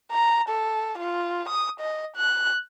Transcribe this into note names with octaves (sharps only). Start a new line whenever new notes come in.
A#5
A4
F4
D#6
D#5
F#6